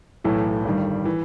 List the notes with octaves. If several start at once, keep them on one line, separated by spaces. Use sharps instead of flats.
B1 A2 E3 A3
G1 G2 D#3 G3
E3